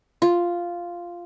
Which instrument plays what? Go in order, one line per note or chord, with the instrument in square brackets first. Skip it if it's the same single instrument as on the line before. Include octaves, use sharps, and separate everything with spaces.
[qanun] F4